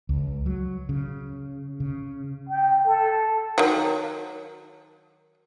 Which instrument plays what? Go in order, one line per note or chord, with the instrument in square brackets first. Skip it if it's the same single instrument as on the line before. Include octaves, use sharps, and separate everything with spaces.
[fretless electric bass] C#2
F#3
C#3
C#3
[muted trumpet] G5
A4
[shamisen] D#3 F#3